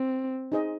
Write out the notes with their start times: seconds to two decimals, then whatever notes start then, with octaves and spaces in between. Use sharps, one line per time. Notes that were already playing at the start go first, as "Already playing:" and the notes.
Already playing: C4
0.52 D#4 G#4 C5 D#5